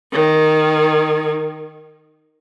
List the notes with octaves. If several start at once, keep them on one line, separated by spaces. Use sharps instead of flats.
D#3